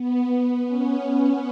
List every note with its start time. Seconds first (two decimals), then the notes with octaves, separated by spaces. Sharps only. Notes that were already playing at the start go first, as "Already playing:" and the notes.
Already playing: B3
0.30 B3
0.67 C#4